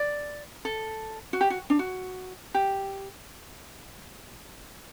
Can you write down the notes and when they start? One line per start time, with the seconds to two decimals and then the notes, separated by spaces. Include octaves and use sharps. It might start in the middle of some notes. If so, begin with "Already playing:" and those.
Already playing: D5
0.65 A4
1.33 F#4
1.41 G4
1.50 F#4
1.70 D4
1.79 F#4
2.54 G4